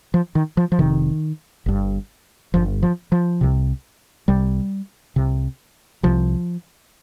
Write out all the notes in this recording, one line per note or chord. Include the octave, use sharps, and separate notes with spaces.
F3
D#3
F3
F3
F1 F2 C3 D#3
G1 G2
G1 G2 F3
F3
F3
C2 C3
C2 C3 G3
C2 C3
C2 C3 F3